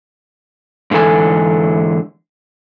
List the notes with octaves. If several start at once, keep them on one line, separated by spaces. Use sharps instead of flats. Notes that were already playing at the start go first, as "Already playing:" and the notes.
G#2 D3 E3 A4 G#5